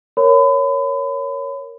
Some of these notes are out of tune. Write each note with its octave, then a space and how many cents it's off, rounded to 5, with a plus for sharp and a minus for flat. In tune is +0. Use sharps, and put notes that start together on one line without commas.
A#4 +0 C#5 +0 B5 +35